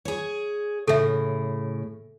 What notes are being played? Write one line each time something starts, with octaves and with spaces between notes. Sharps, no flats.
G#4 C#5
A2 C#3 A4 E5